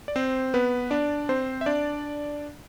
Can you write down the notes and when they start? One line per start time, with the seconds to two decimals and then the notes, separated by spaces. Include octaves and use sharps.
0.08 D5
0.16 C4 C5
0.54 B3 B4
0.91 D4 D5
1.29 C4 C5
1.61 E5
1.66 D4 D5